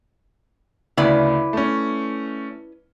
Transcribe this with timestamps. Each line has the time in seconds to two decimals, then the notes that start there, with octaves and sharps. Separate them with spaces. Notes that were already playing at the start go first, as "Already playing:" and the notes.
0.97 D2 C#3 E4 B4 D5
1.53 A3 C#4